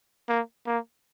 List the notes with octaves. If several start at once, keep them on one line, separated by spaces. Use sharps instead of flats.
A#3
A#3